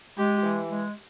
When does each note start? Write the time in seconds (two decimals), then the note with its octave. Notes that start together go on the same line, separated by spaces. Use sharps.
0.18 G#3 G4
0.43 E3
0.69 G#3